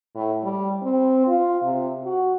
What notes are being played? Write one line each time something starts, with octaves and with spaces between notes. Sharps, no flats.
A2
G3
C4
F4
C3
F#4